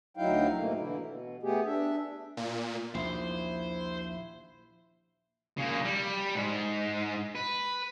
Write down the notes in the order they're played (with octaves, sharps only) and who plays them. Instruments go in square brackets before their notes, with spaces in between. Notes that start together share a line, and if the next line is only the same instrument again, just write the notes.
[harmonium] D2 F#3 D#4 E4 F5 G5
G#2 B2 A3 A#3
D3 E3 E4
B2
A3 B3 G4 G#4
D4 E5
[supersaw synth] A#2
[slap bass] A#1 D#2 [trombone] E4 [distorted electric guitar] C5
[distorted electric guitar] C#3 A#3
G3
G#2
B4